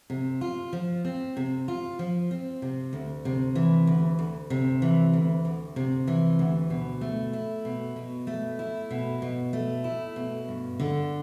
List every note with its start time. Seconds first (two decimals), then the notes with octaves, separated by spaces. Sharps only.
0.10 C3
0.41 F4
0.73 F3
1.05 C4
1.37 C3
1.68 F4
1.99 F3
2.31 C4
2.62 C3
2.93 D2
3.25 C3
3.55 E3
3.87 D2
4.19 D2
4.50 C3
4.82 E3
5.13 D2
5.45 D2
5.76 C3
6.07 E3
6.39 D2
6.70 B2
7.01 A3
7.33 E4
7.65 B2
7.96 B2
8.27 A3
8.59 E4
8.91 B2
9.22 B2
9.53 A3
9.84 E4
10.16 B2
10.48 G2
10.80 D3